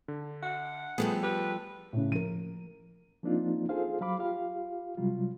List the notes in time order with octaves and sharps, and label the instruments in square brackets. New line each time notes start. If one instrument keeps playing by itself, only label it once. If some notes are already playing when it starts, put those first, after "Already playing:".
[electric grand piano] D3
[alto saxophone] F#5
[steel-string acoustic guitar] F3 G3 A4 [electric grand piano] A3 B3 G#4
[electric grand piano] G4 [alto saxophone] B4
[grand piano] A2 C#3
[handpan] F3 A#4 [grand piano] D#7
[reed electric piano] F3 A#3 C4 D4 D#4 F4
F4 G#4 A4 C5 F5
F#3 F5 B5 D6
F4 G4 F5
C3 F#3 G3 F4